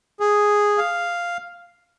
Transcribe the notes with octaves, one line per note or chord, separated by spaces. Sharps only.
G#4
F5